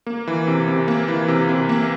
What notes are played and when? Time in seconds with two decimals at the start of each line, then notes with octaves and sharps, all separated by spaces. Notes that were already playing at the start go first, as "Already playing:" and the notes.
0.07 A#3
0.27 E3
0.47 C3
0.68 C3
0.88 A#3
1.08 E3
1.28 C3
1.49 C3
1.69 A#3